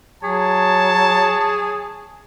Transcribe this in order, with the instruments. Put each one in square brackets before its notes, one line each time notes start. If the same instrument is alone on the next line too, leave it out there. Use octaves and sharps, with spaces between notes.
[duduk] F#3 [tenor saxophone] G#4 [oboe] C#5 [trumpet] A5